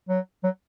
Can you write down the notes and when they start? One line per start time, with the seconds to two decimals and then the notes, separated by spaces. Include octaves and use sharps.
0.09 F#3
0.44 F#3